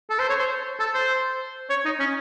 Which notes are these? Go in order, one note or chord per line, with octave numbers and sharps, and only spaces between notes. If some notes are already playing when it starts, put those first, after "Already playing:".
A4
C5
C#5
C5
A4
C5
C#5
D#4
C#4